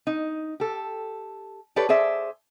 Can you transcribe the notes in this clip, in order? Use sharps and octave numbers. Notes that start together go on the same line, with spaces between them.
D#4
G4 A4
G4 A4 B4 C#5 D5
G#4 C5 D5 E5